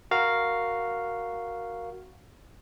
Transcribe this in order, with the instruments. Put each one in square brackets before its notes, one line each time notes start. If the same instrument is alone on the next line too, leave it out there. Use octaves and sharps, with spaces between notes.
[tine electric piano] F#4 A#4 F5